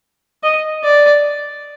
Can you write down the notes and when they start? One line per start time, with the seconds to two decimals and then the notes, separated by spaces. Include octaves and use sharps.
0.43 D#5
0.84 D5